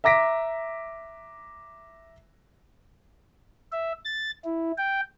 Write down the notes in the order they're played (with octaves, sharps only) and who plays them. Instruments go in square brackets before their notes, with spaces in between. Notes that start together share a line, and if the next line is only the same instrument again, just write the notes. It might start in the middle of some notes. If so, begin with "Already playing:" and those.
[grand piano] E5 A#5 D6 A#6 B6 D7
[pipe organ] E5
A6
E4
G5